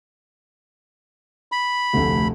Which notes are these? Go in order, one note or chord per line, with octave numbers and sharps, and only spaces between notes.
B5
F1 D2